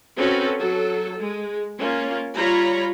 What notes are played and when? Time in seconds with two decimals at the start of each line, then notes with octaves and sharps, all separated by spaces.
0.18 C4 C#4 F#4 A4 B4
0.59 F#3 A4
1.19 G#3
1.79 A#3 C#4 F4
2.36 G3 F4 C#5 A#5 B5